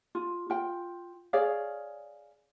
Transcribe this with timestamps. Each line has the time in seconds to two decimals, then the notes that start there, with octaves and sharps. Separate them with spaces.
0.15 F4
0.50 F4 G5
1.33 G#4 C#5 D5 F5